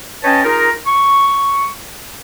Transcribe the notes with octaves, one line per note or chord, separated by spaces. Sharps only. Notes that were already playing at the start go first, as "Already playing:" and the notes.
C#4 B4 C#5 D#5 G5 A5
D#4 F4 G#4 A#4
C#6